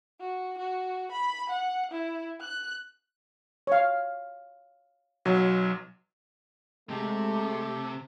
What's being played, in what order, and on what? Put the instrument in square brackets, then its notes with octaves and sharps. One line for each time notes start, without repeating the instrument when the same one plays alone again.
[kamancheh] F#4
F#4
B5
F#5
E4
F#6
[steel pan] C#5 F5
[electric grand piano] B1 F#3
[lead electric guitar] C3 [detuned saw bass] G#3 [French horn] A3 [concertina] G4 A4